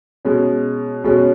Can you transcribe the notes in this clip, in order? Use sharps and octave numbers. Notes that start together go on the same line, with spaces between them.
B2 G#3 C#4
B2 G#3 C#4